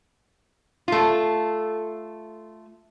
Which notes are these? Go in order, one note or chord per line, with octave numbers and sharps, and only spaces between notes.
A3 F4